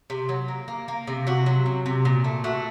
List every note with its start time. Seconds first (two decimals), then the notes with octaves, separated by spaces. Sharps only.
0.10 C3
0.29 F#3
0.48 A#3
0.68 A#3
0.88 A#3
1.07 C3
1.27 C3 F#4
1.46 F#3
1.66 C3
1.86 C3
2.05 A#2
2.24 A3
2.44 A3 F#4